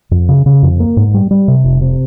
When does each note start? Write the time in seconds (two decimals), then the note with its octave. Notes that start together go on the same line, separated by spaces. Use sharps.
0.11 F2
0.29 C#3
0.46 C#3
0.63 F2
0.80 A#3
0.97 G#2
1.14 G3
1.31 G3
1.48 C3
1.64 F1
1.81 C3